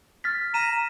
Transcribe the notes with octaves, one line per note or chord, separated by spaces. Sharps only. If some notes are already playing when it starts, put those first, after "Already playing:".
F6 A6 B6
A#5 D#7 E7